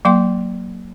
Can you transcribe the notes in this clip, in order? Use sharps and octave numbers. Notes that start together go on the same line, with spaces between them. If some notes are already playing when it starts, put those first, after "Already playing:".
F#3 A#3 F5 G5 C6